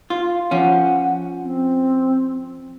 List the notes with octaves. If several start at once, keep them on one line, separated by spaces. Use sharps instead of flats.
F4
F3 C#4 F#5
C4